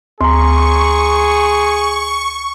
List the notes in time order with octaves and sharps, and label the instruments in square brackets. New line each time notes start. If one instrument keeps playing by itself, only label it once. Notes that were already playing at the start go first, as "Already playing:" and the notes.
[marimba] D2 [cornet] G#4 [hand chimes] A#5 C6 [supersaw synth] C#6